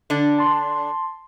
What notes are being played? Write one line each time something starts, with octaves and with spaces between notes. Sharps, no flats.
D3 D4
A5 C6